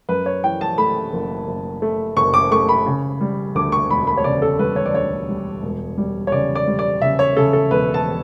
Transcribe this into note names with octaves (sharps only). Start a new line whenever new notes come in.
F#2 B4
C#5
E3 G5
A5
A3 B5
F#1
F#1
A3
F#1 C#6
D6
A3 C#6
B5
C#3
G3
D2 D6
C#6
E1 B5
B5
C#5
C#3 D5
A4
G3 B4
C#5
D5
D2 C#5
G3
E1
G3
C#5
C#3 D5
D5
G3
D5
C#3 E5
C#5
C#3 A4
A4
E1 B4
A5